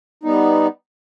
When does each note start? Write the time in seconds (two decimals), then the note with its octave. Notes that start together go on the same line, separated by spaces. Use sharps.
0.23 G3 B3 D#4